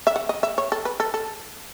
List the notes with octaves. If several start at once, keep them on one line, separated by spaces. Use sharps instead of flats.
E5
F#5
D#5
E5
C#5
A4
B4
A4
A4